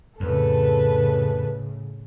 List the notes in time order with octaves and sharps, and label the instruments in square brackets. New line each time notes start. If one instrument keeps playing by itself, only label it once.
[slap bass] F2 [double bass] A2 C#3 [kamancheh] A4 B4